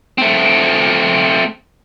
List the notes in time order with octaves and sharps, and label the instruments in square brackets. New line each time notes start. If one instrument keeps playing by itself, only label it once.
[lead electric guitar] A3 C4